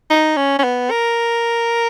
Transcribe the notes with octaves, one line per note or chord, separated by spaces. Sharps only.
D#4
C#4
C#4
B3
A#4